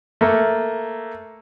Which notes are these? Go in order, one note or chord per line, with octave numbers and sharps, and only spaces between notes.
A3 A#3